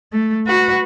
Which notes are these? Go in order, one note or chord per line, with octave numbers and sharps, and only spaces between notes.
A3
F#4 B4